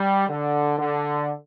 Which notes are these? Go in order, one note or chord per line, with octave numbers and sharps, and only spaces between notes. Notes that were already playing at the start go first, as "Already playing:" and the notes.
Already playing: G3
D3
D3